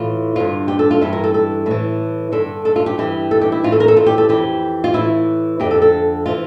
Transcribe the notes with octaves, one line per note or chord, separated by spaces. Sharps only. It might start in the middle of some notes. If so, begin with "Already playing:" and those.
Already playing: A2 E3 F4
G2 D3 F4
G4
A4
F4
G2 E3 E4
A#4
A4
A4
A2 E3 A4
G2 D3 A4
A4
F4
G4
G2 E3 G4
A4
G4
E4
A2 E3 F4
A4
A#4
A4
F4
G4
A4
F2 E3 G4
F4
A2 E3 E4
F2 D3 G4
A4
A4
C3 E3 F4